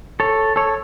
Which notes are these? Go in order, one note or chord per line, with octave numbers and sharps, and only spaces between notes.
A4 C#5
A4 C#5